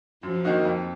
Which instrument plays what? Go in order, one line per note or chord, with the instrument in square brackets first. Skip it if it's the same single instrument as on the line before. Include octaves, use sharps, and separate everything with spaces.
[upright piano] F#2 [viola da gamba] F3
[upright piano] D#3 A#3 D#4 F#4
F2